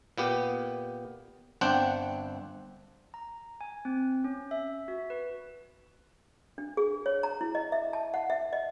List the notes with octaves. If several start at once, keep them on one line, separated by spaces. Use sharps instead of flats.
A#2 B3 G4
G1 C4 D4 F#5 G5
A#5
G#5
C4
C#4
E5
F#4
B4
D4
G#4
C#5
A#5
E4
D#5
E5
A5
F#5
E5
D#5